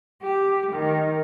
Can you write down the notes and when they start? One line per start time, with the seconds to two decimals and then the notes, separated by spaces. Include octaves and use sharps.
0.21 G4
0.72 D#3